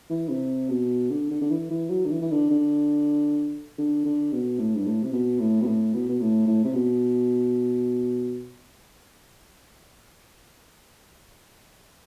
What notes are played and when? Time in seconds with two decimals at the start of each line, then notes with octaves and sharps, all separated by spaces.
0.10 E3
0.29 C3
0.69 B2
1.11 D3
1.31 D3
1.41 D3
1.50 E3
1.70 E3
1.90 F#3
2.05 D3
2.12 E3
2.22 E3
2.32 D3
2.51 D3
3.78 D3
4.05 D3
4.33 B2
4.59 A2
4.76 G2
4.87 A2
5.03 C3
5.13 B2
5.40 A2
5.61 B2
5.66 A2
5.94 B2
6.09 B2
6.21 A2
6.47 A2
6.65 C3
6.74 B2